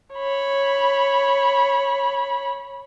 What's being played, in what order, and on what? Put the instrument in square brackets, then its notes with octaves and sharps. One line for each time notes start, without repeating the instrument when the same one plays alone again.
[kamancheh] C#5 B5